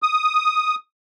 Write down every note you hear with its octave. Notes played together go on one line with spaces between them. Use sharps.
D#6